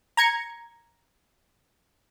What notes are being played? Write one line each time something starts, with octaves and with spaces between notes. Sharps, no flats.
A#5 G#6 C#7